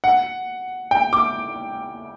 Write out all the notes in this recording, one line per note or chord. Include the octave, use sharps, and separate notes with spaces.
F#5
G5
D6